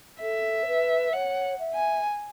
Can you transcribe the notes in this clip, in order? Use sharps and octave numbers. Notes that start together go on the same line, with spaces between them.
A4 E5
C#5
B4
C#5 F#5
E5
G#5